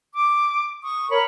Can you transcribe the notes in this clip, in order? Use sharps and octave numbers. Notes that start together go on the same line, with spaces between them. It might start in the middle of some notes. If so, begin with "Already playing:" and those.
D6
C#6 D#6
A#4 C#5 B5